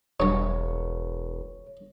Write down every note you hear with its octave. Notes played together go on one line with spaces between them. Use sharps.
E1 G2 F#3 C#5